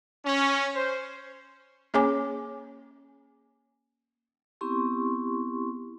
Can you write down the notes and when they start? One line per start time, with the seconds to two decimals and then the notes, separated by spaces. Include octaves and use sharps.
0.25 C#4
0.74 C5
1.94 A#3 C#4 G#4 C#5 G#5 D6
4.61 B3 C4 E4 G4 C6 C#6